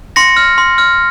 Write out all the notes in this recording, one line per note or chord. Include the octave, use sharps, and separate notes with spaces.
C6 A#6 C#7
F6
C6
F6